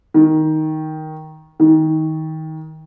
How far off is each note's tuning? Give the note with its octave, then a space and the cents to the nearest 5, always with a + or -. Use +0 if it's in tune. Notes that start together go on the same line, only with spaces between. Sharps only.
D#3 +5
D#3 +20